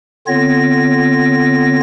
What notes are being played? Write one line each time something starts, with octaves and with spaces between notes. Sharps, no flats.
D3 B3 C4 F4 C#5 A#6